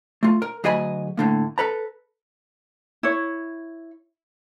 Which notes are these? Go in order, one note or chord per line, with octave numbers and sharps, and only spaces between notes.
A3 F4
A#4
D2 F#3 G#4 D#5 G#5 B5
A2 D3 A#3
A4 B4 A#5
E4 C#5